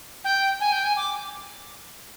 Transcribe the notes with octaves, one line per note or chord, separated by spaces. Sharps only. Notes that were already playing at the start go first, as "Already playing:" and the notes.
G5
G#5
G5
G#5
D6